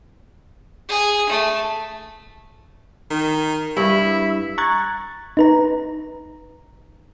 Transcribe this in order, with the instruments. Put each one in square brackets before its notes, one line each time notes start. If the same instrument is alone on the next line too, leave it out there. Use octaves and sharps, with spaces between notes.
[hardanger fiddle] G#4
A3
[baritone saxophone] D#3
[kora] G2 [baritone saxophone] E4 [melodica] E5
[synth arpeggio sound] A#5 C#6 F#6 G#6 A6
D#4 B4 A#5